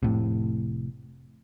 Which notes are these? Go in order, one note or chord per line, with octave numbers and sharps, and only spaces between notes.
F1 A#1 A2 C3